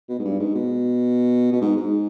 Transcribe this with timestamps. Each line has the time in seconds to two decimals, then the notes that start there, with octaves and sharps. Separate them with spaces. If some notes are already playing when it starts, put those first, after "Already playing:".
0.09 B2
0.19 G#2
0.24 G2
0.39 G#2
0.55 B2
1.52 B2
1.61 G#2
1.76 G#2